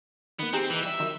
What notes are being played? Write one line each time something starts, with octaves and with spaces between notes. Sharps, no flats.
D#3 A#3 B3
C4 D#4 G4 G#4
E3
F3 G3 E5
D#3 F#3